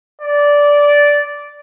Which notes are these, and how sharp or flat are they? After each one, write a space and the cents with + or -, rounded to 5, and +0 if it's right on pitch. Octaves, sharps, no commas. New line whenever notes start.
D5 -10